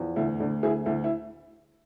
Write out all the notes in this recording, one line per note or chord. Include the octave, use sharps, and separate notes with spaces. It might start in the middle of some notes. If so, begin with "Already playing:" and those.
Already playing: E2 F3
D2 E4
D2 D4
D2 E4 G#4
D2 E4
E4